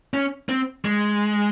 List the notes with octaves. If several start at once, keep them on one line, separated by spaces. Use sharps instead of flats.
C#4
C4
G#3